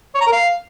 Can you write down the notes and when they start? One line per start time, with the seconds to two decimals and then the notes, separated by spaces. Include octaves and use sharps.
0.15 C#5
0.21 A#5
0.27 A#4
0.32 F5